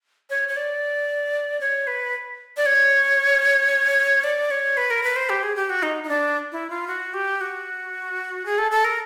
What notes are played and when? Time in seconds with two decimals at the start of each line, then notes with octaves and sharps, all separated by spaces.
0.30 C#5
0.48 C#5
0.56 D5
1.61 C#5
1.87 B4
2.57 D5
2.66 C#5
4.24 D5
4.51 C#5
4.77 B4
4.91 A#4
5.03 B4
5.16 C5
5.29 G4
5.43 G#4
5.56 G4
5.70 F#4
5.83 D#4
6.03 D#4
6.09 D4
6.52 E4
6.70 F4
6.87 F#4
7.14 G4
7.41 F#4
8.46 G#4
8.58 A4
8.71 A4
8.85 A#4